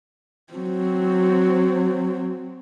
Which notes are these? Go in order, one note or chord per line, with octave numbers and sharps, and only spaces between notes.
F#3 C4